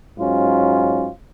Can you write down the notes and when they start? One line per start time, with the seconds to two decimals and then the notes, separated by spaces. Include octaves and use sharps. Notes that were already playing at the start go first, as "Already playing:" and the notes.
0.18 G#2 F#3 C#4 F4